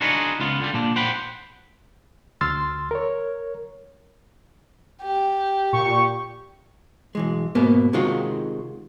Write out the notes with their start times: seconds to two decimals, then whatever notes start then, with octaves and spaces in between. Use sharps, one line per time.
0.01 D4 D#4 F4 F#4 G#4 B4
0.40 C#2 B3 F4
0.61 D3 G3
0.74 A#2 D4
0.96 C5 F#5 G5 B5
2.41 D2 C6 E6 F6 A6
2.91 A#4 C#5
5.03 G4
5.73 A#2 C#6
7.15 B1 E3 G#3
7.55 G#2 B2 A#3 B3
7.93 C3 D#3 G#3 F4 F#4